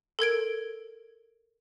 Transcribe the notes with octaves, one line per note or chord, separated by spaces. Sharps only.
A4 A#4 G#6 D7